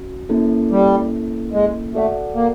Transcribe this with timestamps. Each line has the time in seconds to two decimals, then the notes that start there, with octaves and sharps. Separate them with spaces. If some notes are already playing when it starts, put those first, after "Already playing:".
Already playing: C#4 F#4
0.29 A#3 C#4 E4 A4
0.71 G3
1.53 G#3
1.94 A3 F#4 A4 D5 F#5
2.35 A#3